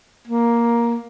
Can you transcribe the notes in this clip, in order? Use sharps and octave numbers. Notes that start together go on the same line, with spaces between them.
A#3